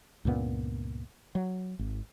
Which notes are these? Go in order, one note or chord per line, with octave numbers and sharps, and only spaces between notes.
C#2 G2 A#2 B3
F#3
G#1